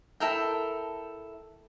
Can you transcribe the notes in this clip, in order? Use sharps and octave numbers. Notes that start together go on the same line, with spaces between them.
E4 A4 A#4 G5